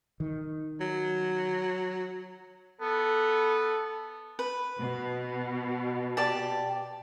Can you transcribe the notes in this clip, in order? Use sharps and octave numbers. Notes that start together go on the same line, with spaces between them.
D#3
F#3
B3 A4
B4
B2
G4 D5 A5